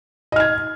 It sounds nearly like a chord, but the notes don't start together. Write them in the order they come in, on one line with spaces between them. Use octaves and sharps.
D#5 F6 G#6